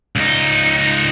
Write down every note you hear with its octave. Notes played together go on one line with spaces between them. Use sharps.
C#2 D#4